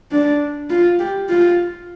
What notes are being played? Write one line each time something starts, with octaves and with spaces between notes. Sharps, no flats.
D4
F4
G4
F4